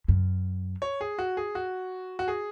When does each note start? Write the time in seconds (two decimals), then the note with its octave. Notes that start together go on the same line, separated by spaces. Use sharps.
0.08 F#2
0.82 C#5
1.01 G#4
1.18 F#4
1.37 G#4
1.55 F#4
2.19 F#4
2.28 G#4